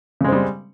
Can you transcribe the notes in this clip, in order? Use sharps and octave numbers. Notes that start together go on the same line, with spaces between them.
C#3 G3 G#3 C4